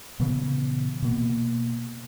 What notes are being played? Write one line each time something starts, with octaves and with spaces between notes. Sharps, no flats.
A#2 C#3 E3 B3
B2 A#3